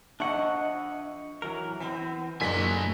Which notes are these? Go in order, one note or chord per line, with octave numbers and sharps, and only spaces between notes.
F2 D4 D#5 E5 F#5 C#6
E3 F#3 A#4
E3 B3 C4
F#1 A#2 A3 D4 F#4 A4 G#5 B6